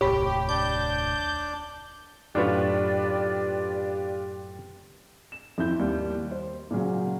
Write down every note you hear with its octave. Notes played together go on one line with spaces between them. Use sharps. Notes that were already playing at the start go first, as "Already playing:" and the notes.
D#1 C2 A2 G4 C#5 B5
D4 D5 D6 G6
F#2 A2 D4 F4 G4 B4 C#5 D5
E7
F2 C4 E4 G6
D#2 G3
C5
A#2 C#3 F#3